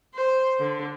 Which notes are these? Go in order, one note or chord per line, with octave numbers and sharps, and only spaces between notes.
C5
D3